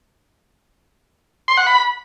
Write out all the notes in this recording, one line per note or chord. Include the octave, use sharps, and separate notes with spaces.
C6
F#5
B5